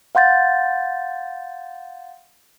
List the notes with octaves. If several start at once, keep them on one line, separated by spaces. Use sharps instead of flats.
F5 F#5 C6 G6 A6